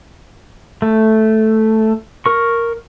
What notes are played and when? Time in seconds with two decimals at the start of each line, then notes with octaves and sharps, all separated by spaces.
0.82 A3
2.26 A#4 C#6